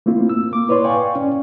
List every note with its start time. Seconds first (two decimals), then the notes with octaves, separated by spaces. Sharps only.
0.06 A3 A#3 C4 E4 F4
0.29 E6
0.51 A#3 D6
0.68 E4 B4 C#5 D5 C6
0.84 D5 F5 G5 G#5 C#6
1.15 C#4